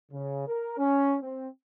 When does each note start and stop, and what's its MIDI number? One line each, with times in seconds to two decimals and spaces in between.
0.12 0.45 49
0.48 0.75 70
0.78 1.16 61
1.22 1.48 60